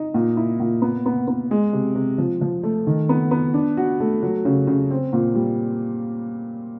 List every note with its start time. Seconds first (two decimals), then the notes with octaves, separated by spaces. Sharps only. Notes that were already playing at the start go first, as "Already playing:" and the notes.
Already playing: D#4
0.14 A#2
0.37 E4
0.60 A#2
0.82 B3
1.06 B3
1.28 B3
1.51 G#3
1.73 C3
1.95 C3
2.18 F3
2.41 F3
2.63 A3
2.87 D#3
3.09 B3
3.31 B3
3.54 D4
3.77 F#4
4.00 A3
4.22 F#3
4.45 C#3
4.67 C#3
4.90 C4
5.13 A#2
5.35 G3